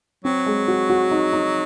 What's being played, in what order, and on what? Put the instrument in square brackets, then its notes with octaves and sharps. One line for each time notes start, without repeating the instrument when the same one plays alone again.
[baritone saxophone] F#3 [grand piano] C4
[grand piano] G#3
F#4
F#4
D#4
D#4